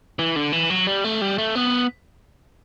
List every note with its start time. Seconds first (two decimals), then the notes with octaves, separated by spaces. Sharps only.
0.19 E3
0.36 D3
0.52 E3
0.70 F#3
0.87 G3
1.04 A3
1.22 G3
1.38 A3
1.55 B3